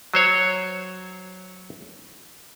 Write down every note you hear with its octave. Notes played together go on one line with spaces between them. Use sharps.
F#3 C5 C#5